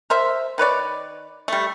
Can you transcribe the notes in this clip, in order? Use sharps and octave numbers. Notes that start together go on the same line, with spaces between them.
A#4 C5 E5
D#3 B4 C#5 D5
G3 A3